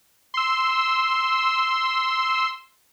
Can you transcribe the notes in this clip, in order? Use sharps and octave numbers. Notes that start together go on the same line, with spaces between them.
C6 E6